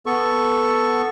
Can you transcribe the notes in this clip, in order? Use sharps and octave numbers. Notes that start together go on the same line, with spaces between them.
B3 A4 C#6